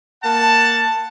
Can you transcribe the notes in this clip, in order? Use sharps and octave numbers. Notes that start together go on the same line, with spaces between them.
A#3 F#5 A5